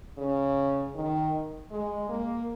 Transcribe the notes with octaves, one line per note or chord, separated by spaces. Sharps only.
C#3
D#3
G#3
A#3